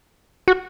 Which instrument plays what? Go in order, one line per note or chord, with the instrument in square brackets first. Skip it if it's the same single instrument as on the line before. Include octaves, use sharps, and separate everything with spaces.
[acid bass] F#4